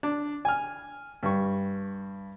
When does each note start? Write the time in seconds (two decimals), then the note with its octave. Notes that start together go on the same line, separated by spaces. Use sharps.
0.03 D4
0.45 G#5 F6
1.23 G2 C#6